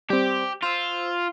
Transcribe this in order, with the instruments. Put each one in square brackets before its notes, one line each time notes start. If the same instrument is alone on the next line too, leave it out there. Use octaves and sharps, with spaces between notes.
[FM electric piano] G3 C4 [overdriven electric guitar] G4
[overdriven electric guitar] F4 [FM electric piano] C5 E6